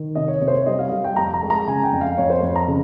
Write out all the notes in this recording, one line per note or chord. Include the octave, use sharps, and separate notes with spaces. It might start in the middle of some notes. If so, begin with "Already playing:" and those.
Already playing: D#3
C3 D#5
C#5
C3 C#5
C5
C#5
G3 D#5
F5
G3
G5
F2 A#5
A#5
G#3
A#5
C#3 G#5
G5
F2
F5
F2 C#5
C5
F2
A#5
C#3